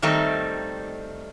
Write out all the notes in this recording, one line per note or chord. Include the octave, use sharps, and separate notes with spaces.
D#3 G3 A3 C4 D#4